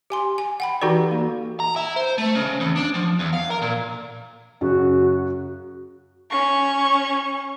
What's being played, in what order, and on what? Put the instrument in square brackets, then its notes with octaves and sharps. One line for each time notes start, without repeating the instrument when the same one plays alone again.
[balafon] G4 G#5 C6
G#5
F#5 G5 B5
E3 D#4 F#4 G4 A4 D5
A#3
[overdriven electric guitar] A#5
E4
C5
A3
C#3
E2
D4
F3
E2
F5
A#4
A#2
[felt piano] F#2 C#3 [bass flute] F#4
[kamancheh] C#4 C#6